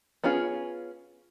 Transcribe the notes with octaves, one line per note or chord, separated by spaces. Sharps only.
B3 C#4 F4 G#4